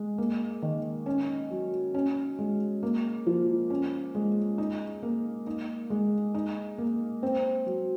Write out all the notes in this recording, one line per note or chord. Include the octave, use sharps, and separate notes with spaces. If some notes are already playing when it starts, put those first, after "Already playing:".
Already playing: G#3
A#3
D#3
C#4
F#3
C#4
G#3
A#3
F3
C#4
G#3
D#4
A#3
D#4
G#3
D#4
A#3
C4
F#3